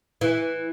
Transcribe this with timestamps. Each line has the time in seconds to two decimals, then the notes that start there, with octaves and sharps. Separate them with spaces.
0.21 E3